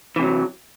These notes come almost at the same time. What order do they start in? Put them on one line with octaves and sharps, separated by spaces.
E3 C3 F#3